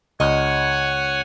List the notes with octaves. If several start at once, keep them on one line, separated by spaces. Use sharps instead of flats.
C#2 C#5 D#5 F#5 G#5